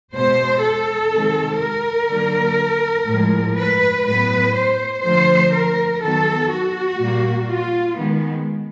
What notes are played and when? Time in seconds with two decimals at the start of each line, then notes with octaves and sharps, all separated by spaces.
0.13 B2 G#3 B3 C5
0.62 A4
1.11 C3 D#3 G#3
1.60 A#4
2.09 D3 F#3 A#3
3.08 A2 F3 G#3
3.56 B4
4.05 A2 F#3 B3 B4
4.54 C5
5.03 D3 F3 A3 C5
5.52 A#4
6.01 D#3 F#3 B3 A4
6.51 F#4
7.00 A#2 G3 A#3
7.48 F4
7.97 D#3 G#3 B3